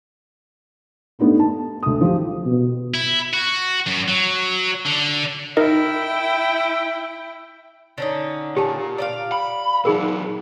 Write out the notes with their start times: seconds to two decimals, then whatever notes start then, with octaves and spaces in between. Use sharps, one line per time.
1.19 A3 B3 D4 D#4 G4
1.39 A5
1.83 D2 D#6
2.01 F3 G3 G4
2.46 B2
2.94 E4
3.33 F#4
3.87 F#2
4.08 F#3
4.85 D3
5.57 D#4 E4 A#4 D#5 G5
7.98 D3 C#4 D#4
8.56 A#2 G4 A5
8.98 D5 D#5 F5
9.32 B5
9.85 A#2 F#3 D#4 G#4 A#4